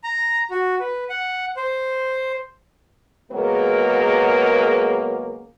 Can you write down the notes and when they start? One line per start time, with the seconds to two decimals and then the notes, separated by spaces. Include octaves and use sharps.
0.04 A#5
0.51 F#4
0.80 B4
1.09 F#5
1.57 C5
3.31 C#3 F#3 G#3 A#3 B3 A#4